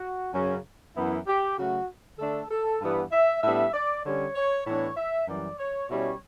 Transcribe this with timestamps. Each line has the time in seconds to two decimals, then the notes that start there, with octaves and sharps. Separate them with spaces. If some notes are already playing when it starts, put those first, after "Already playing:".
Already playing: F#4
0.34 F#2 C#3 F#3 C#4
0.96 F#2 E3 B3 E4
1.27 G4
1.58 C#3 F#3 A3 F#4
2.18 D3 A3 D4 A4
2.50 A4
2.80 G2 E3 G3 B3
3.11 E5
3.42 A2 G3 B3 D4 E5
3.73 D5
4.04 D3 G3 C#4 C#5
4.35 C#5
4.65 A2 E3 B3 D4 C#5
4.96 E5
5.27 F#2 E3 G3 D5
5.58 C#5
5.89 B2 G3 C#4 E4 C#5